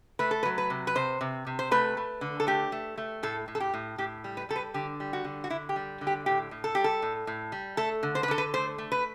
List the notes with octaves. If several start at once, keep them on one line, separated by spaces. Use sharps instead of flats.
A3 B4
A4
B4
F#3
B4
C3
B4
C3 C5
C3
C3
C5
A3 B4
A3
D3
A4
A3 G4
A3
A3
A2 A4
A2
A4
G4
A2
A2 G4
G3
B4
G3 A4
B4
D3 G4
G3
F#4
D3
F#4
D3 E4
G4
G3
D3
G4
A2 G4
A2
A4
G3 G4
A4
A2
A2
G3
A3 A4
D3
C5
B4
D3 A4
B4
A3 C5
A3
B4